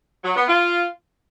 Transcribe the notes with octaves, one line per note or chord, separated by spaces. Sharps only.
F#3
B3
F4